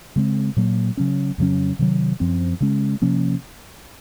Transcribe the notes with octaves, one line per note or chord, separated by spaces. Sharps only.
C#3 G#3 C4
A#2 F#3 A#3
C#3 F#3 C#4
F2 C#3 F#3 C#4
C3 D#3 F#3
F#2 F3 C4
C#3 G#3 C#4
C3 F3 A#3 C#4